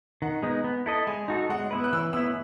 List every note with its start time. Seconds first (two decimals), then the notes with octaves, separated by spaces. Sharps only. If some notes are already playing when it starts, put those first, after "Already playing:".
0.22 D#3 F#5
0.43 G#3 B3 D#4
0.64 B3
0.86 E4 A4 D#5
1.07 G#3 G#5
1.28 D#4 F#4 A4
1.49 G#3 F#5
1.71 B3 E4 B4
1.84 F#6
1.93 E3 E6
2.13 B3 E4 E6